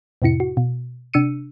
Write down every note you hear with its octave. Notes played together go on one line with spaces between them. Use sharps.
F2 A2 C3 E4 C#7
F#4
B2
C3 D4 E6 C#7 D#7